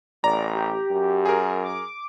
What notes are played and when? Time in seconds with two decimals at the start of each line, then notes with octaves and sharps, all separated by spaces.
0.24 A1 D5 A#5
0.55 G4
0.91 F#2
1.26 G#4 A#4
1.63 D6